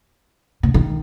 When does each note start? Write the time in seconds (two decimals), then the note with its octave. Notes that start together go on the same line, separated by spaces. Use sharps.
0.63 C#3
0.74 D#3